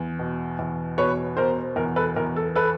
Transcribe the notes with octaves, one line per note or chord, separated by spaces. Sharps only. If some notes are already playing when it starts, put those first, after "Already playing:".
Already playing: E2
B2
E2
B2 B4 C#5
B2 A#4 C5
E2 A#4
A4 B4
E2 A#4
A4
A4 B4